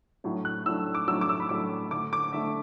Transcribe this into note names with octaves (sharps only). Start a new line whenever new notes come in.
A2 F#3 A3 D4
F#6
A2 F#3 A3 D4 E6
D6
A2 F#3 A3 D4 E6
D6
E6
B5
A2 F#3 A3 D4 D6
D3 A3 D4 D6
D6
D3 A3 D4 E5